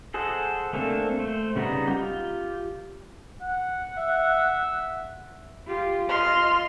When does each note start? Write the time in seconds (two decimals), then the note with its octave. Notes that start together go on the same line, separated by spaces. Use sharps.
0.14 G#4 A4 C5 D#5 F#5
0.73 A3 A#3 C4 D4 A4
1.19 A3 C5
1.56 C#3 G3 B3 D#4 A#5
1.87 F4 G4
3.41 F#5
3.97 E5
5.67 F4 G4
6.09 F4 D#5 C6 F6